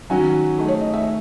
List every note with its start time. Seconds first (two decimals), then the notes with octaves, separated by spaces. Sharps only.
0.10 D#3 F#3 C#4 F#4 G#5
0.58 A3 D#4 G#4
0.68 C#5
0.81 D#5
0.94 E5